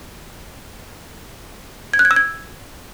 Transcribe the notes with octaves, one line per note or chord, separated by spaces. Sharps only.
G#6
F#6
G#6
E6
G#6